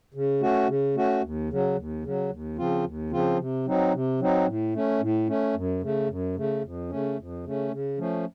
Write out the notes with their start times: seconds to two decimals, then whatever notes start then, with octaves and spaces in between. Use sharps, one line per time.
0.14 C#3
0.41 A3 C#4 F#4
0.68 C#3
0.95 A3 C#4 F#4
1.22 D#2
1.50 C#3 F#3
1.76 D#2
2.03 C#3 F#3
2.30 D#2
2.57 C#3 F3 C4 F4
2.84 D#2
3.11 C#3 F3 C4 F4
3.39 C3
3.66 F#3 C4 D#4
3.93 C3
4.20 F#3 C4 D#4
4.47 A2
4.74 A3 C#4
5.01 A2
5.28 A3 C#4
5.55 F#2
5.82 C#3 A3
6.09 F#2
6.36 C#3 A3
6.64 F2
6.90 C#3 A3 C#4
7.18 F2
7.44 C#3 A3 C#4
7.72 C#3
7.98 F3 A3 C#4